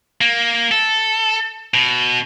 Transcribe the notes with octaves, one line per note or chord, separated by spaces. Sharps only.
A#3
A4
B2